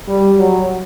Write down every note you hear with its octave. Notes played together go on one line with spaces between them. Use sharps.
G3
F#3